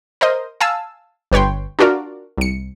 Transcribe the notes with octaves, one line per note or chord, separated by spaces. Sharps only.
A#4 C5 D#5
F5 G#5 A5 E6
G1 B4 C#5 G5 C6
D4 F4 F#4 A#4 D5
C2 C#7